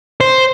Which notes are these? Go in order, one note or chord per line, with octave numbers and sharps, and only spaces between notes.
C5